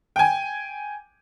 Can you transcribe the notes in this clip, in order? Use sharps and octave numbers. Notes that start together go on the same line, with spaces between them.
G5 G#5